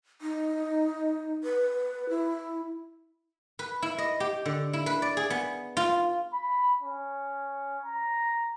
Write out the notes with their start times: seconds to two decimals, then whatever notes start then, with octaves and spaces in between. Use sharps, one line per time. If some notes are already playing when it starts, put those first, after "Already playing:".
0.21 D#4
1.44 B4
2.10 E4
3.59 B4
3.82 E4
3.98 D#5
4.20 G4
4.45 D3
4.73 E4
4.86 B4
5.02 D5
5.17 G#4
5.30 B3
5.77 F4
6.33 B5
6.83 C#4
7.85 A#5